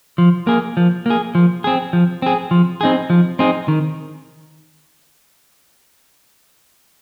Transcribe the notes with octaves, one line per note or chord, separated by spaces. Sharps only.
F3
A#3 G#4
F3
A#3 G#4
F3
C4 G#4
F3
C4 G#4
F3
C4 D#4 G#4
F3
C4 D#4 G#4
D#3